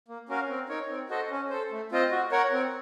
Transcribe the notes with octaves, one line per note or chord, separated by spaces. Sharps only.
A#3
C#4 F#4 A#4 F5
C4
D#4 A#4 C#5
C4
F#4 A4 C5 D#5
C#4
A4 C5
A3
C4 F4 C5 D#5
F#4
A#4 C#5 F#5
C4